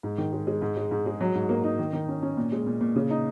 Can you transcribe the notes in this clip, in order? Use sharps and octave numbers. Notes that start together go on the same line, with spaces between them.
G#2
D#3
G#3
G#3
G#2
G#3
G#2
G#3
F#3
G#2
A#3
D#4
D#3
D#3
C#4
C#4
A#2
G#3
A#2
A#2
C#3
D#4